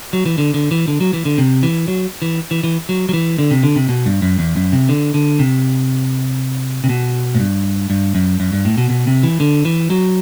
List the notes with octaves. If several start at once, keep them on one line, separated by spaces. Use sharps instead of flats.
F#3
E3
D3
D3
E3
D3
F#3
E3
D3
C3
E3
F#3
E3
E3
E3
F#3
F#3
E3
D3
C3
D3
C3
B2
G2
F#2
E2
F#2
C3
D3
D3
C3
C3
B2
A2
G2
G2
F#2
F#2
G2
A2
B2
B2
C3
E3
D3
E3
F#3